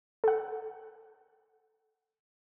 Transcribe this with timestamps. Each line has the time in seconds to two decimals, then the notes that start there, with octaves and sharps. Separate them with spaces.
0.24 A4 F#5